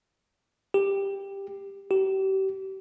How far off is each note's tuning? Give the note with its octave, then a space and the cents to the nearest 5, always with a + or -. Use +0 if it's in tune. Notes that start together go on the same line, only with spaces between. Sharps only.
G4 +10
G4 -35